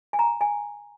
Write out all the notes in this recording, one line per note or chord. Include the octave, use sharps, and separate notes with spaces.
G#5
A#5
G#5